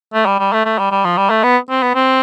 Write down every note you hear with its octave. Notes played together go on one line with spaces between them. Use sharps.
A3
G3
G3
A3
A3
G3
G3
F3
G3
A3
B3
C4
B3
C4